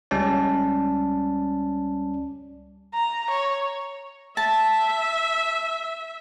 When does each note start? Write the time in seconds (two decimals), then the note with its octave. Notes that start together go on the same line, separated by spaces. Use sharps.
0.11 C#2 G3 C#4 D5 A5
2.94 A#5
3.30 C#5
4.37 E5 A5